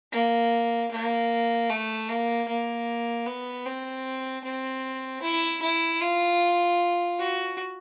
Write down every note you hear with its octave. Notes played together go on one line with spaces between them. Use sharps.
A#3
A#3
A3
A#3
A#3
B3
C4
C4
E4
E4
F4
F#4